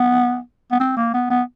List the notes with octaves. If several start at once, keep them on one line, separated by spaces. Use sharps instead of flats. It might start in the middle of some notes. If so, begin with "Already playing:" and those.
Already playing: B3
B3
C4
A#3
B3
B3